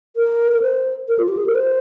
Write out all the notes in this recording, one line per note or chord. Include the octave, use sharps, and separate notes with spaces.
A#4
A#4
C5
A#4
F4
G4
G#4
A#4
C5